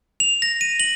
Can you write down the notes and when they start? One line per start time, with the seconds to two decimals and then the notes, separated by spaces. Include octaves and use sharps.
0.20 F7
0.42 A#6
0.61 D#7
0.80 F#7